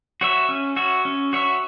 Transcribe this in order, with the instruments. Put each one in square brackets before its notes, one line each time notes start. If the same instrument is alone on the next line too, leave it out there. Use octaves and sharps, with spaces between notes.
[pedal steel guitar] F#4 C#5 E5
C#4
F#4 C#5 E5
C#4
F#4 C#5 E5